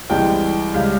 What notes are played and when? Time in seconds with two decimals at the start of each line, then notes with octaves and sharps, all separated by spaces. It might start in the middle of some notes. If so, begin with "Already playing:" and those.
0.10 C2 C3 E3 G#3 G5
0.74 C#2 C#3 G3 F5